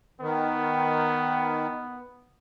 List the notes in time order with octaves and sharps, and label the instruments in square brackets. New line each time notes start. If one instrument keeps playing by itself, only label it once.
[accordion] D#3 [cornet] B3